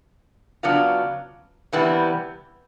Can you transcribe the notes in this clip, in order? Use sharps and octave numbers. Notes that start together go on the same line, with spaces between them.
C#3 F#3 B3 D4 F4
C3 E3 G3 B3